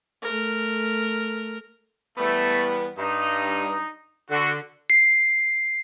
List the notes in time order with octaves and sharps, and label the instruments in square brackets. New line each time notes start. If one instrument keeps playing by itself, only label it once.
[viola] A3 A#4
[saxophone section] E2 G3 B3 [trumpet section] A3
[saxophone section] G2 [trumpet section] D#4
[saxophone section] D3 [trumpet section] F#4
[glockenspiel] C7